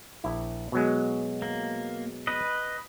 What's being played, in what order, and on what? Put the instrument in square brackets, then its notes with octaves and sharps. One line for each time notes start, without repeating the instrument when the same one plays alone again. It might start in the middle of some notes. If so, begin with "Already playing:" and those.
[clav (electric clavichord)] A#1 E4
B2 F#3 G#3
[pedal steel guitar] A#3
B4 D#5